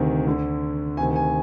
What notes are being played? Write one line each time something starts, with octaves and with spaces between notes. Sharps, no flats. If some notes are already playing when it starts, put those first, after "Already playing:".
Already playing: D2 C3 D#3
D2 D3
D2 C3 D#3 G#5
G#5